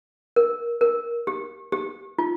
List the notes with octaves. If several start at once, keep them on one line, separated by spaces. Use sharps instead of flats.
A#4
A#4
G4
G4
F4